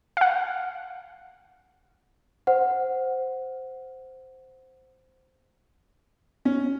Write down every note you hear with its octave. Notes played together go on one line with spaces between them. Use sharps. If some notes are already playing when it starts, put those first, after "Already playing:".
F5 F#5
C5 F#5
C#4